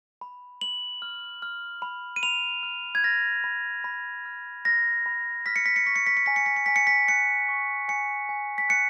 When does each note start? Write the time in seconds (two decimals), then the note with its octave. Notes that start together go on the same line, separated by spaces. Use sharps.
0.21 B5
0.61 B5 F#7
1.02 F6
1.42 F6
1.82 B5
2.16 D#7
2.23 B5 F7
2.63 F6
2.95 G#6
3.04 F6 A#6
3.44 B5
3.84 B5
4.26 F6
4.65 F6 A#6
5.06 B5
5.46 F6 B6
5.56 C#7
5.66 B6
5.76 C#7
5.86 C#6 B6
5.96 C#7
6.07 B6
6.17 C#7
6.26 G#5 B6
6.36 C#7
6.46 B6
6.56 C#7
6.66 G#5 B6
6.76 C#7
6.87 B6
7.08 F#6 C#7
7.49 C#6
7.89 G#5 C#7
8.29 G#5
8.58 B6
8.69 F#6 C#7